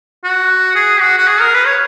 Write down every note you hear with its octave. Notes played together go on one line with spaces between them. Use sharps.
F#4
G#4
F#4
F#4
G#4
A#4
B4
C#5